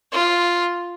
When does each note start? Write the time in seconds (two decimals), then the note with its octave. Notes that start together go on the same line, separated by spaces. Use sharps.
0.12 F4